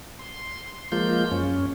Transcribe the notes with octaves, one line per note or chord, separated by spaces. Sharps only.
C6
F3 G#3 A#3 F4 G6
F#2 C#4